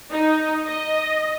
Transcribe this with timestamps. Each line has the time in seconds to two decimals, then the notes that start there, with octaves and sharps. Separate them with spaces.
0.10 D#4
0.66 D#5